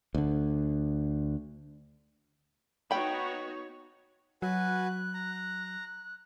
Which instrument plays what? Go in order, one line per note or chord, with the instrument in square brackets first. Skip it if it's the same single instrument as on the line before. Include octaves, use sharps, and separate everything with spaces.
[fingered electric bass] D2 D3
[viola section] B3 D#4 F#4 [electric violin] C#5 [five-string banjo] G5 B5
[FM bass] F#3 [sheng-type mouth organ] F#4 B4 G#5 [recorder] F#6
[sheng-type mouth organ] A#5